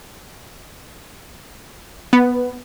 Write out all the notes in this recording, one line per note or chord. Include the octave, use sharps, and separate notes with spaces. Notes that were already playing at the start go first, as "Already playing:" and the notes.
B3